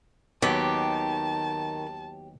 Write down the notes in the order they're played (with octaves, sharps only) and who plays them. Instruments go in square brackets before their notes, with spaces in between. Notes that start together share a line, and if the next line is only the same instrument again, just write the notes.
[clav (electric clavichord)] D#2 F#3 B3 [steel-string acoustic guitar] D#3 [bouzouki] G4 [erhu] A5